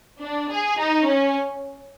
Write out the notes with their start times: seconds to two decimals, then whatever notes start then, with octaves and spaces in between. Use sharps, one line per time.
0.21 D4
0.49 G#4
0.78 D#4
1.06 C#4